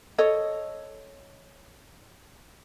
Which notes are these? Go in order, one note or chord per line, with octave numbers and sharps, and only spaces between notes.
A4 C#5 D#5